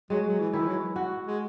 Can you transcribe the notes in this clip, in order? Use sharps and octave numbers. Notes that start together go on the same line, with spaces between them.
F#3 G#3
F#3
E3
D#3 E4
E3
F#3
F#4
G#3